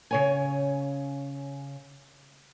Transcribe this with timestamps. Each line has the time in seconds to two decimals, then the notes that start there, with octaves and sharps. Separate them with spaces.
0.11 C#3 C#5 G#5